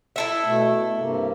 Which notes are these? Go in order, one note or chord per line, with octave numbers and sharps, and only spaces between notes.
E4 A4 E5
B2 A3
A3
G2 C3 A#3